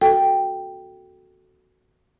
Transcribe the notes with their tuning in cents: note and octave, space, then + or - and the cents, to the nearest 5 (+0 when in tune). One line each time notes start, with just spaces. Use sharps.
F#4 +0 A4 +0 G5 +0